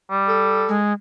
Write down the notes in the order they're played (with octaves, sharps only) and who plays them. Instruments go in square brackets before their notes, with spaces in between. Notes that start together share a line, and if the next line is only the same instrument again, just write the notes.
[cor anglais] G3
[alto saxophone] A4
[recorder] G#3